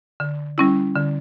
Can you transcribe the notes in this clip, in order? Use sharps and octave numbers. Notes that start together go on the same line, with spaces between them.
D3
G3 C#4 E4
D3